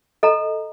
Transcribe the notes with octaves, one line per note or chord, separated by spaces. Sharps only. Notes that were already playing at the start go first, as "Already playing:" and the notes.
A4 D#5 A#5